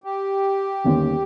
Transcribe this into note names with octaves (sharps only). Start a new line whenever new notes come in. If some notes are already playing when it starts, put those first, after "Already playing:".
G4
G1 D#2 C#4